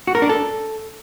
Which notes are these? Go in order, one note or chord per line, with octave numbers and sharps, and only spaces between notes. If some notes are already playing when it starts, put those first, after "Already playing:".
F#4
A#4
D4
A4